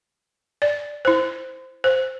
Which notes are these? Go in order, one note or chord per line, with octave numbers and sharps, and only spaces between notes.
D5
E4 C5
C5